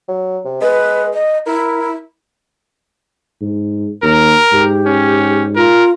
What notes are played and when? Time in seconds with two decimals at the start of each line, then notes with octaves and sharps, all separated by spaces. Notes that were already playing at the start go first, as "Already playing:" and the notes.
0.08 F#3
0.45 C3
0.62 G#3 B4
1.14 D#5
1.46 E4 A#4
3.41 G#2
4.03 D#2 A#4
4.52 G#2 G4
4.86 C#4
5.56 F4 A#4